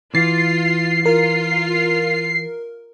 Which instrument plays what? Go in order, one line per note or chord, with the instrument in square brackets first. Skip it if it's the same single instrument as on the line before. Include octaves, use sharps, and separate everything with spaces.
[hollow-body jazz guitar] E3 [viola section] F4 [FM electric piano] A6 [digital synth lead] C7
[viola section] F4 [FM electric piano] A#4